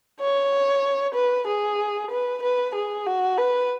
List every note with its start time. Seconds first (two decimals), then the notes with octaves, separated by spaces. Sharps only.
0.20 C#5
1.15 B4
1.47 G#4
2.11 B4
2.42 B4
2.75 G#4
3.07 F#4
3.38 B4